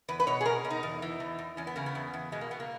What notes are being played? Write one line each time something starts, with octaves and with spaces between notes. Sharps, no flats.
E2 B4
B4
B2 C#5
G#4
B2 A#4
B2
D#4
E2
E3
E2
E2
E2 C#4
B3
C#3 A#3
B3
E2
E2
B2 G#3
A#3
B2 B3
A#3